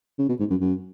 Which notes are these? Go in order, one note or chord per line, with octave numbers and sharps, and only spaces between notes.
C#3
B2
G#2
F#2
F#2